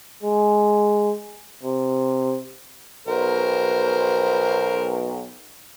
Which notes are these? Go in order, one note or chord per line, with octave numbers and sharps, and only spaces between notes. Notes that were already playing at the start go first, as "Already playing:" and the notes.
G#3
C3
B1 A#4 C5